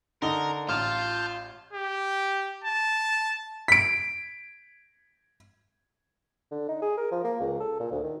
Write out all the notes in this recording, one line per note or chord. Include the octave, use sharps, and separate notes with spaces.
D3 D#4 A#4 G7
A1 F4 A5 F6 G6
G4
A5
B6 D7
D3
D#4
G#4
A#4
F3
A#3
C#2
A4
A#2
D2
D#3